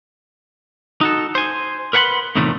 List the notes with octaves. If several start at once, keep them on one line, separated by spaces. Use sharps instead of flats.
D#4 F#4 A4
C5 G#5
A#4 B4 F#5 G#5 B5 C6
E2 A2 C3 D#3 F3 A3